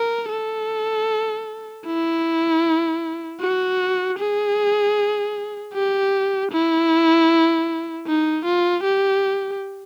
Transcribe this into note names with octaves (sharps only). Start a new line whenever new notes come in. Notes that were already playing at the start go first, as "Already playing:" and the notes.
Already playing: A#4
A4
E4
F#4
G#4
G4
E4
D#4
F4
G4